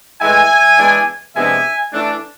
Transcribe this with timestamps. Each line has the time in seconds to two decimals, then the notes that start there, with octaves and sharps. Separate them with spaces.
0.21 A2 E3 G#3 E5 G#5
0.78 E3 G#3 B3 D4
1.35 C3 F3 G#3 B3 D4 E5 G#5
1.92 E3 A3 D4